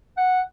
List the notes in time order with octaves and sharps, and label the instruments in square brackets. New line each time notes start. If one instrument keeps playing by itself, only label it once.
[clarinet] F#5